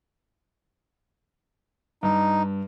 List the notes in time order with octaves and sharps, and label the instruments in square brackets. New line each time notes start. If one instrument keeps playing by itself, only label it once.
[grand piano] G2 [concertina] D#4